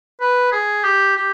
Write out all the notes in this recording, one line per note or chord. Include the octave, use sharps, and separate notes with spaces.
B4
G#4
G4
G4